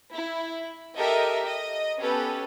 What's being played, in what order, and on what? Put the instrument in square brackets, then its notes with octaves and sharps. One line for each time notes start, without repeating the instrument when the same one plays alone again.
[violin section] E4
G4 A4 A#4 D#5 E5
D#5
B3 C#4 G4 A4 B4